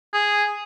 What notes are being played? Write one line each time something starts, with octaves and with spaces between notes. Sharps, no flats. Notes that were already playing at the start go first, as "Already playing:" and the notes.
G#4